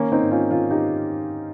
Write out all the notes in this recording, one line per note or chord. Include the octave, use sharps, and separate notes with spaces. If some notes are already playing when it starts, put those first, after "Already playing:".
Already playing: D#3 A#3 C#4
C4 D#4
G#2
C#4 F4
D#3 C#4 F4
D#4 G4